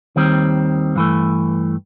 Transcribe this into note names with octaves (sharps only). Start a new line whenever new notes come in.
D#2 D#3 G3 C4
G2 E3 A3